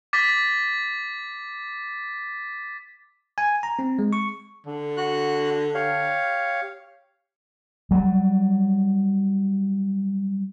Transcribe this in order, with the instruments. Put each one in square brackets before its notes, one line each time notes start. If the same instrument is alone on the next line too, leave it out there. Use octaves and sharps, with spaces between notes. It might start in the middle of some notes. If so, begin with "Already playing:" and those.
[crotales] D6 A6 B6
[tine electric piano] G#5
A#5
C4
G#3
C#6
[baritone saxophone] D3
[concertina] F#4 F#6
G4 C#5 F5
[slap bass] F#3 G3